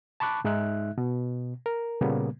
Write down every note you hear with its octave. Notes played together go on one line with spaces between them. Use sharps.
A5 B5 C#6 D6 F#6
G#2 G#3 D#4 E5 F#6
B2
A#4
A#2 C#3 G3 A#3 B3